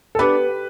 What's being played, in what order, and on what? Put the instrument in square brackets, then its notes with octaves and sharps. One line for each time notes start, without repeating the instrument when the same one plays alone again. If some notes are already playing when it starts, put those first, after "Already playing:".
[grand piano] A4
[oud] B3 D4 [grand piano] G4 B4